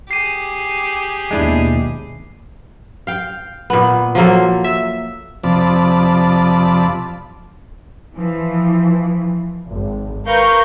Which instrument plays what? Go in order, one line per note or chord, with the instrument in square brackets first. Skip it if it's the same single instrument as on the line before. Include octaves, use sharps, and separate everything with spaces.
[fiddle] G4 G#4 [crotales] C7 D#7
[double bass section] D#2 B2 [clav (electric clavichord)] G#3 D4 E4
[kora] F5 G5
A#2 B3
F3 F#3 A#3 A4
E5
[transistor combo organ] F2 C3 F3 D5 A5 B5
[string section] E3 F3
G#1
A#4 B4 F5 A#5 C#6 G6